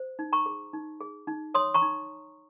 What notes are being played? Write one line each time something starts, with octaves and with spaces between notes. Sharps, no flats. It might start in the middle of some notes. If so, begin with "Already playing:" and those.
Already playing: C5
D#4
A#5 C#6
G#4
D#4
G#4
D#4
C#5 C6 D#6
A#5 C#6
D#4